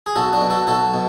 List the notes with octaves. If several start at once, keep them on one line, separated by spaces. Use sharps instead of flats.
G#4
B1 F#4 A4
D4 F#4
B2
F#4 A4
B1 F#4 A4
B2